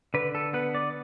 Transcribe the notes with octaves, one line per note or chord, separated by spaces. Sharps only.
D3 B4
A4
B3 B4
D5